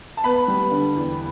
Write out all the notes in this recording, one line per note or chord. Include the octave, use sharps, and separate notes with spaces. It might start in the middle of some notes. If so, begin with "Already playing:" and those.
A5
B3 B4 B5
G3
D3
E2